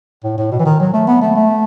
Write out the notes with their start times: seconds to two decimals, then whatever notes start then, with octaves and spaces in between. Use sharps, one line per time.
0.24 A2
0.38 A2
0.52 B2
0.60 E3
0.65 D#3
0.80 F#3
0.94 A3
1.08 B3
1.21 A3
1.35 A3